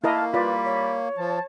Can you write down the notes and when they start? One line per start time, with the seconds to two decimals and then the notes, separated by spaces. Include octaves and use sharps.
0.04 A3 A#3 E4 A#4 D#5 F5 A5
0.34 G3 F4 B4 D5 B5
0.65 C#5
1.18 F3 A5